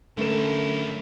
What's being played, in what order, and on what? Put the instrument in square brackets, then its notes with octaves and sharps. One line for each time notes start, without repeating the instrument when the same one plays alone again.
[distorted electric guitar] F#2 E4 [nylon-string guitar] D3 C#4 [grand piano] A3 A#4 E7